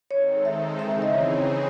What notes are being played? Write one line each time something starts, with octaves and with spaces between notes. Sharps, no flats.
D#3 G#3 C4 D#4 A4 C#5
E5
C#3 E3 C4 D#4 G#4 E5
E5
D#5
C#5